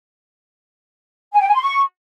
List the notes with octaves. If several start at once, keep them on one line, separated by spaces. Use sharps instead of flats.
G#5
G5
G#5
C6
C#6